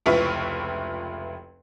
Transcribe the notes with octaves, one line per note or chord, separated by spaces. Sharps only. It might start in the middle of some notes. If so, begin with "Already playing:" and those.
F1 C#2 E4 F4 B4 C#6